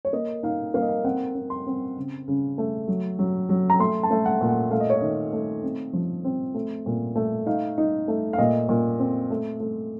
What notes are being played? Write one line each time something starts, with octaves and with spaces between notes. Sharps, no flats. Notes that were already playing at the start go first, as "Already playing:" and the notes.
C#5
A#3 D#5
D#4 F5
A#3 F5
D#5
F5
C4 F#5
C4
C6
C4
C#3
C#3
A3
F#3
F#3
F#3
A#5
A3 C6
A5
A3
F#5
A#2
F#5
A3 F5
D#5
C#5
D#3 D#5
A3
C4
F3
C4
A3
A#2
A3
D#4 F5
D#4
A3
F5
A#2 D#5
A#2
C4
A3
A3